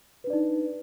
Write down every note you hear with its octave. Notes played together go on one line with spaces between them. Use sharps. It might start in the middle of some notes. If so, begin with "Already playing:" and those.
D4 D#4 B4 D5